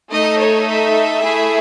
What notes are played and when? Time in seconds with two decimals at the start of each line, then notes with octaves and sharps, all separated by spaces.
0.12 A3 D#4 A4 D#5
0.40 C#5
0.68 E5
1.24 A3 E4 G#4